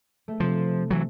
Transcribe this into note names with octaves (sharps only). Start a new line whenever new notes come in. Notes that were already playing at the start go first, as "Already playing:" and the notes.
A3
C3 F3 C4
E3 F#3